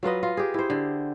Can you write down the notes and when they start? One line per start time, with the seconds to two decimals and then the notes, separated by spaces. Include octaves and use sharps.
0.03 F#3 F4 B4 D#5
0.23 F4
0.37 G4 G#4
0.54 E4 C5
0.70 D3